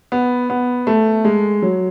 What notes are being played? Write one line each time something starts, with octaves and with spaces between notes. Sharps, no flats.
B3
B3
A3
G#3
F#3